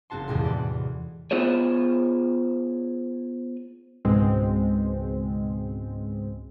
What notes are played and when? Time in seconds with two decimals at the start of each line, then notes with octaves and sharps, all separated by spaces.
0.10 F#1 C4 F#4 A5 C6
0.28 D#1 E2 A2 C3 G#3 C6
0.43 B4 D5 F#5
1.31 B3 F4 G#4 C5 C#5
4.05 C#2 G#2 B2 G#3 C4